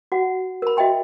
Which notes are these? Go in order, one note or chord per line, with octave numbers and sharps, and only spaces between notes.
F#4 F#5
A#4 B5
F#4 D#5 E5 G5 C6